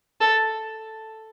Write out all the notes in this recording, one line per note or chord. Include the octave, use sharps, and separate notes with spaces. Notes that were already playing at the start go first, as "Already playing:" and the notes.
A4